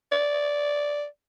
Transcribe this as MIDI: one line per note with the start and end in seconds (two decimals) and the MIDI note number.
0.12 1.05 74